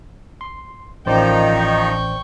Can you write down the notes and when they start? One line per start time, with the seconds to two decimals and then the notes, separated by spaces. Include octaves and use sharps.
0.41 C6
1.06 A1 D#3 F3 D#4 C5 D5 G5
1.55 G5 C#6